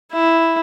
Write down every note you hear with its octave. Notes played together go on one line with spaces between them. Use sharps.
E4